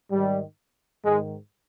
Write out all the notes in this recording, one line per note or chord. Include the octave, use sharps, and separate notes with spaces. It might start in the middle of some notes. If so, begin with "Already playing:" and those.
G#2 D#3 G3
G#2 D#3 G#3